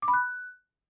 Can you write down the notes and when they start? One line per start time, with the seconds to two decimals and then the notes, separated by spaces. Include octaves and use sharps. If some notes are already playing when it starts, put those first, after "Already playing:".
0.02 D6
0.08 B5
0.14 F#6